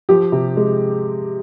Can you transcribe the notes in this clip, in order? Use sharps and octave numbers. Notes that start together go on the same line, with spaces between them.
F3 G4
C3
G#3